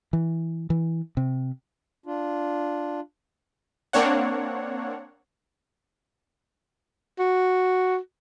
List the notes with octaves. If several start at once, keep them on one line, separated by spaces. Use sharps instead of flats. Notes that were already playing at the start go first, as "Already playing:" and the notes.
E3
E3
C3
D4 F4
A#3 C4 D4 C#5 F#5
F#4